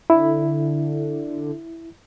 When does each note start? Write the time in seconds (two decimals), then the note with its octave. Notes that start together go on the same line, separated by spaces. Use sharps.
0.10 D3 E4